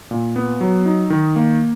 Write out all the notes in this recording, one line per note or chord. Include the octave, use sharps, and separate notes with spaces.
A#2
B3
F#3
D#4
D#3
A#3